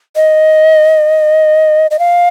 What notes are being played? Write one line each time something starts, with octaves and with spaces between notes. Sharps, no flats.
D#5
D#5
F5